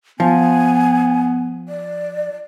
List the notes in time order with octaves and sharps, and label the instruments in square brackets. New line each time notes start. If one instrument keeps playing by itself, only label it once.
[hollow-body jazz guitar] F3 [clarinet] B3 [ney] G#5
[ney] D5